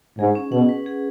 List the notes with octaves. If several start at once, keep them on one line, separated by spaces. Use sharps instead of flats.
G#2 G#4
C#4
B2 F#5
B4
G#4